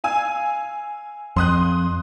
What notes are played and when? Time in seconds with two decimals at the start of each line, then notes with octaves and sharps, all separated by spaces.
0.04 F5 G#5 E6
1.36 F2 C6 D#6 F#6